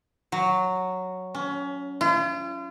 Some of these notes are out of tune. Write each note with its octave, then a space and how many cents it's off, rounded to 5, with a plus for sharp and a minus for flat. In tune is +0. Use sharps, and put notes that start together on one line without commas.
F#3 +0
C#4 +25
F4 -40